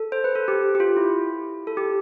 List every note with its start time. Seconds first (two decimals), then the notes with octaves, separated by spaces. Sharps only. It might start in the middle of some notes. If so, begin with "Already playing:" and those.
Already playing: A4
0.12 C5
0.24 B4
0.35 A4
0.48 G4
0.75 G4
0.80 F4
0.97 E4
1.67 A4
1.77 G4